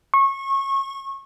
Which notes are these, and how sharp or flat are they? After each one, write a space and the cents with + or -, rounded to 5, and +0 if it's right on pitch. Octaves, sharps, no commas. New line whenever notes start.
C#6 -25